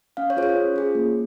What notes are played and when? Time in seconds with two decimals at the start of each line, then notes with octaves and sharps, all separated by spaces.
0.17 C#4 F5
0.30 C#5
0.37 F4 G#4 C5
0.43 C#5
0.56 C#4
0.76 F4 G#4
0.95 A#3